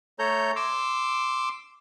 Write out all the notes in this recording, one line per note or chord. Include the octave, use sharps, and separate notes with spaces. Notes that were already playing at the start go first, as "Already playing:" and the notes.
A3 A4 C#5 A#5 G6
C6 D6 E6